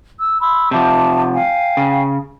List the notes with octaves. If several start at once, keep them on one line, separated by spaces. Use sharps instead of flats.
E6
B5 C6 E6
C3 F3 E5 A5 D6
F5 G5 G#5
C#3